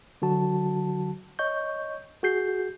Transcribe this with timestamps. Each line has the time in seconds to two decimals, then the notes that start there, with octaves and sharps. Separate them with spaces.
0.22 D3 F#3 F#4 A5
1.39 C#5 D#5 C#6 G6
2.23 F#4 G#4 G6 C7